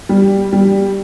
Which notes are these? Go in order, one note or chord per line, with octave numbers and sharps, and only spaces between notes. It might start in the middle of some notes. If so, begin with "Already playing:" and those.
G3
G3